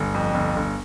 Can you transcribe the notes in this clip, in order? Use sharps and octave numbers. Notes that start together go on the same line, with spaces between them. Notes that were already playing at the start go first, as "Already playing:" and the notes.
Already playing: G1
F2
G1
G1